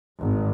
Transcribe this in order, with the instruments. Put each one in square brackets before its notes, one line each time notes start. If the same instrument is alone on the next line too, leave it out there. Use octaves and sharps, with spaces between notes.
[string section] G#1